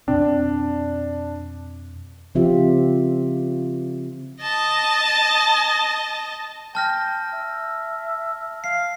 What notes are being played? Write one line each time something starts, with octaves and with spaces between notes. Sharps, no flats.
F2 B2 C4 D4
C#3 F3 C4 F4 G4 E5
D#5 A5
G5 A5 F6 A#6
E5
F5 C7